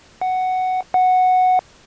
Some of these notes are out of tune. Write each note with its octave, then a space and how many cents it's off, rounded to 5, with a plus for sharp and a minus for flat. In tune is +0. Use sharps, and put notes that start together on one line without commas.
F#5 +5
F#5 -5